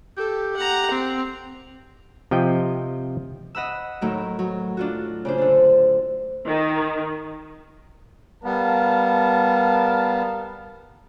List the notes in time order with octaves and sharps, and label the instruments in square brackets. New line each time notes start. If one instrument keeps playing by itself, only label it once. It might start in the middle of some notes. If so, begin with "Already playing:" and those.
[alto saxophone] G4 [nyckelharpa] A4
[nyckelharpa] F#5 A#5
C4
[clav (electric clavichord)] C3 F3 D#5 G5
[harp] D#5 F#5 B5 E6
A2 D#3 F#3
F#3
D4 F4 F#4
C#3 D4 C5
D3 D4
[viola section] D#3
[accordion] G3 B3 [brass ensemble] A#4 F5 A5